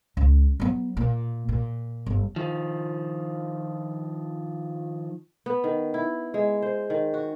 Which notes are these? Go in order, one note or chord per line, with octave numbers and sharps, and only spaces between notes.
C#2
F#3 B3
A#2
A#2
G1
D#3 F3
B3
D#3
E4
G#3
C5
D#3
F#4